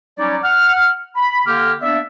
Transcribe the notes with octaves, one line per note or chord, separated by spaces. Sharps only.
F#3 G3 C#4 D#4 C#5 D5
F#5 F6
B5
D3 A#3 G4 F6
A#3 B3 D4 D5 E5